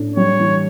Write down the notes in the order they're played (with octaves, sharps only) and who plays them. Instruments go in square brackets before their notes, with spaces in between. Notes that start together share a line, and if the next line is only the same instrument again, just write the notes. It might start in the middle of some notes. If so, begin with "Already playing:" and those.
Already playing: [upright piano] A2 D4
[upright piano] G3 [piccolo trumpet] C#5
[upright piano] E3